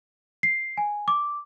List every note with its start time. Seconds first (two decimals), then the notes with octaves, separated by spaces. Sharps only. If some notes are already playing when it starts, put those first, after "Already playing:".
0.43 C7
0.78 G#5
1.08 D6